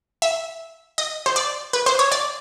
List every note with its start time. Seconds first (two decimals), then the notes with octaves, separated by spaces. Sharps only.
0.22 E5
0.98 D#5
1.26 C5
1.36 D5
1.73 B4
1.86 C5
1.99 C#5
2.12 D5